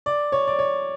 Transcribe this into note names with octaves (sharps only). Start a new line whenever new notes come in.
D5
C#5
D5
C#5